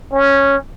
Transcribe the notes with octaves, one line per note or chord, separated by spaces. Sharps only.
C#4